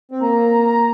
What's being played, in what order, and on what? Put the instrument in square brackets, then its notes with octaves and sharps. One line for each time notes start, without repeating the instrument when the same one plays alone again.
[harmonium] C4
[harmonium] A#3 [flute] A#5